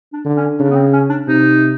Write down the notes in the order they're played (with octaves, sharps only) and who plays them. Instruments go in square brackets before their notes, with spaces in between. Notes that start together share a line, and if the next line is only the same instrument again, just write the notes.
[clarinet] D4
[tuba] D3
[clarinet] C#4
[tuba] C#3 [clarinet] D4
[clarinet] B3
C4
C#4
D4
[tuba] C3 [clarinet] D#4